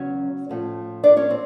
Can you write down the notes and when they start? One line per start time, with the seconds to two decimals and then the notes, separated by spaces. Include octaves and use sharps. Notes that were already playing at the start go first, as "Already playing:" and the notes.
Already playing: E2 C#3 F#3 C#4 C#5
0.49 A2 F3 A3 C#4
1.03 D4 D5
1.17 C#4 C#5
1.30 C4